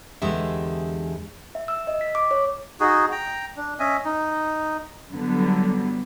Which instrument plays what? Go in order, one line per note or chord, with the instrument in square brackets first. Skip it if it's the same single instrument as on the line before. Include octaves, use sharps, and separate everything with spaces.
[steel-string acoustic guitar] E2 D3 G#3 G4 E5
[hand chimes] E5
E6
D#5
B6
D6
C#5
[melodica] D#4 F#4 G#4
G5 A#5
D4
C#4 D#5 E5 G#5
D#4
[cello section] D3 F#3 G3 B3